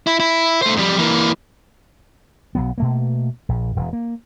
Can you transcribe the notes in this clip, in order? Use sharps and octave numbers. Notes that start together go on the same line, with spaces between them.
E4
E4
A3 C5
F2 G3
E3 A#3
B1 F#3 B3
B2 A3 A#3
A#1
E1
A#3